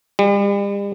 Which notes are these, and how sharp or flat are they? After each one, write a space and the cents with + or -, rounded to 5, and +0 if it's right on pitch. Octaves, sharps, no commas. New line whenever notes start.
G3 +40